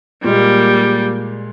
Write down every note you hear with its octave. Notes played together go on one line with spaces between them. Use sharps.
A#2 G3 G#3 A#3